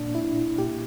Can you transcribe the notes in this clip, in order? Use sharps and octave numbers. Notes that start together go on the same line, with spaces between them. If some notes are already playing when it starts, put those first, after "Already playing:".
Already playing: A#2 D4
E4
A#2 G4